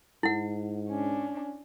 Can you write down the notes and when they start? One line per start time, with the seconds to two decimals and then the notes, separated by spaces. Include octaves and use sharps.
0.23 G#2 E4 F#5
0.89 C#4 D4